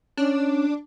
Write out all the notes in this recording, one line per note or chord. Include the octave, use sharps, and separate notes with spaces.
C#4 D4